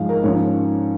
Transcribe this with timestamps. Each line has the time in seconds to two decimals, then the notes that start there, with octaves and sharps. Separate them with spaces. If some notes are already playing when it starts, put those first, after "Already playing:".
Already playing: G#2 F3 G#3 F5
0.09 A#4
0.23 G#2 F3 C#4 C#5